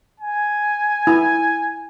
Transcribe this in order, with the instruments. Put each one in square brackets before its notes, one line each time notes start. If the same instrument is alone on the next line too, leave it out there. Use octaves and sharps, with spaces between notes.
[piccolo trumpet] G#5
[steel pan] E4